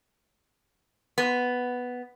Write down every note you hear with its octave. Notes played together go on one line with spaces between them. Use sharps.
B3